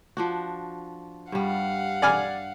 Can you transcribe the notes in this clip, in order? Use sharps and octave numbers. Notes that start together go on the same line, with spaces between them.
F3 D4 F#4
G2 G3 F5 F#5
D5 G#5 F6